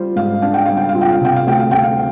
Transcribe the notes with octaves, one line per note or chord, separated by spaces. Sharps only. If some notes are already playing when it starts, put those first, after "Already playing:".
Already playing: G3 F4 C5
G#2 F5
D4 F5
G5
G3 F5
G5
F5
F4
G5
F5
C3 G5
F5
D2 G5
F5
D2 G5
F5